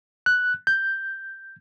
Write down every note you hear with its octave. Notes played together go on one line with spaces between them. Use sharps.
F#6
G6